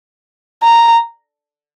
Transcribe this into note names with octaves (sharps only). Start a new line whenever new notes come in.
A#5